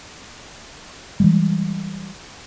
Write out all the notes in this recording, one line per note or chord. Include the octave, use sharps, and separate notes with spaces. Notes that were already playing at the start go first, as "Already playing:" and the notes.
E3 G3 G#3